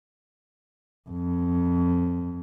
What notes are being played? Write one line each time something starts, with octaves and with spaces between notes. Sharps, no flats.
F2